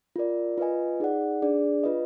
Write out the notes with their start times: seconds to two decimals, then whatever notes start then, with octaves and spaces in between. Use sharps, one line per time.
0.16 F4 A#4 D5
0.58 F4 B4 D#5 G#5
1.00 D#4 G#4 D5 F#5
1.42 D4 G#4 D5
1.84 F4 B4 D#5